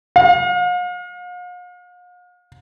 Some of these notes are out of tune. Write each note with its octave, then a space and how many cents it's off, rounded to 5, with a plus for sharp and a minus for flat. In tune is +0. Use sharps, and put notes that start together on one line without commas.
F5 +45